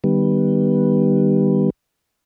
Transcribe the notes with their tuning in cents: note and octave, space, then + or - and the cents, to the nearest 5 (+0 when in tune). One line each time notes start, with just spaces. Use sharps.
D#3 -30 G3 +0 B3 -10